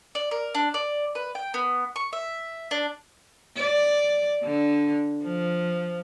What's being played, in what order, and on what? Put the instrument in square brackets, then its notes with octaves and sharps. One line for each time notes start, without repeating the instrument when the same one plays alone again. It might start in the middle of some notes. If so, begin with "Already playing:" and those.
[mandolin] D5
A#4
D4
D5
B4
G5
B3
C#6
E5
D4
[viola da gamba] D5
D3
F3